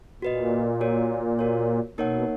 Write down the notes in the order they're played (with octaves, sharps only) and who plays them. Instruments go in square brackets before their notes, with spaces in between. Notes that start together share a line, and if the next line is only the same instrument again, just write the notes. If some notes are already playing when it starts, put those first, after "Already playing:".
[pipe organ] A#2 [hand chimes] F#4 B4 D#5
[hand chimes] F#4 A#4 C#5
F#4 A#4 C#5
[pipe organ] B2 [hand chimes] A#3 D#4 A#4 C#5 F#5